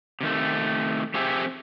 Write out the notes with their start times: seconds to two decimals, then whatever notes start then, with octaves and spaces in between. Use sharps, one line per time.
0.21 C3 D#3 A3
1.14 F2 A3 C4 G4 G#4 E5